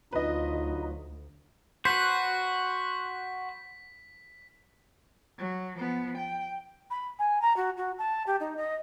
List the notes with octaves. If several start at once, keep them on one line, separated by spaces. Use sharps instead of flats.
D2 F#3 D4 D#4 F4 B4 D#5
F#4 B4 C5 B6
F#3
F3 B3
G5
B5
G#5
A#5
F#4
F#4
A5
G4
D#4
D#5